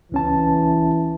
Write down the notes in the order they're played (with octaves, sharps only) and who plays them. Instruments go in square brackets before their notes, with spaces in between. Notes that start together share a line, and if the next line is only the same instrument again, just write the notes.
[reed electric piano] C#2 C#4 A5 [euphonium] E3